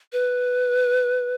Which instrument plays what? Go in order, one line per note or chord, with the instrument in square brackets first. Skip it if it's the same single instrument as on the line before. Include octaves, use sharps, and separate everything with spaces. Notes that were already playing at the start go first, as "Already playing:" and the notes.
[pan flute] B4